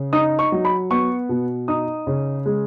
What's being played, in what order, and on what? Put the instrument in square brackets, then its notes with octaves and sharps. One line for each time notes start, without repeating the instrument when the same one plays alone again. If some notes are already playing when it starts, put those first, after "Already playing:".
Already playing: [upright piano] C#3
D#4 D#6
C#6
F#3
B5
B3 C#6
B2
D#4 D#6
C#3
G#3